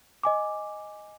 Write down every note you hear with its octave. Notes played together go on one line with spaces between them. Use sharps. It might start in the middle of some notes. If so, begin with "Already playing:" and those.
D#5 G#5 D6